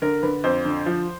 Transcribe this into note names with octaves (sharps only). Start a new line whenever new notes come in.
D3 A#4
D3 B4
F2 C5
D3
F3